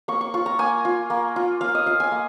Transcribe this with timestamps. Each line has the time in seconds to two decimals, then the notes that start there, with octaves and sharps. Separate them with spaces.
0.08 A#3 C#6
0.21 C#6
0.34 F4 C#6
0.46 A#5
0.59 A#3 G#5
0.85 F4
1.10 A#3
1.36 F4
1.61 A#3 F5
1.75 D#5
1.86 F4 F5
2.00 G#5
2.12 A#3